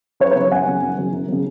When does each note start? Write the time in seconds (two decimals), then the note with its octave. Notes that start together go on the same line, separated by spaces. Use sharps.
0.20 F#2 B4 C#5
0.31 B4 C#5
0.35 C#3 F#3
0.51 F#2 F#5 G#5
0.67 C#3 F#3
0.82 F#2
0.98 C#3 F#3
1.13 F#2
1.28 C#3 F#3